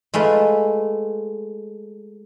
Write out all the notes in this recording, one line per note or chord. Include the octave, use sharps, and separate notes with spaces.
G#3 A3 F4 B4